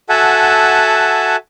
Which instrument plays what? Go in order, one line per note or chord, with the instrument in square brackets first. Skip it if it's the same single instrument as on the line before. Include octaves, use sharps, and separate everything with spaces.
[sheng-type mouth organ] F#4 A4 E5 F#5 G#5 A5